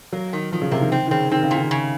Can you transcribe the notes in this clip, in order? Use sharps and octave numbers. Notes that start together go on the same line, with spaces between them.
F#3 A#3
D#3
D#3 F3
C#3
C3 A#3
D#3
D#3 C4
D#3
C#3 C4
D#3 C4
C#3
A#2 D#3
C#3